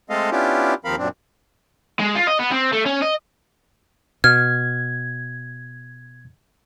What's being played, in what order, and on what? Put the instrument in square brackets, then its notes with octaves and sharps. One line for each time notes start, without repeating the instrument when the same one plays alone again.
[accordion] G#3 A3 C4 A4 D#5 F5
B3 C#4 D4 E4 F4 G4
D#2 F3 C4 A#4 F5 B5
F#2 A#2 C4 D4
[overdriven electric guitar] G#3
F4
D#5
B3
C4
A3
C#4
D#5
[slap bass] B2 [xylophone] F6 [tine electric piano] G#6